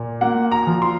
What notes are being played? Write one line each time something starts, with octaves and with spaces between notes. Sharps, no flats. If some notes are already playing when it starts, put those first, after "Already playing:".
Already playing: A#2
A#3 F#5
A#5
F3
C6